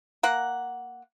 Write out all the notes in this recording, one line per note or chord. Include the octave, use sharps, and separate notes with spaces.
A#3 F#5